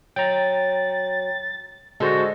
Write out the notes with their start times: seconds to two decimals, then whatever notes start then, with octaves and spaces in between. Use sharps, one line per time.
0.16 F#3 G5 A#5 A6
2.00 D3 G#3 F#4 A4 C5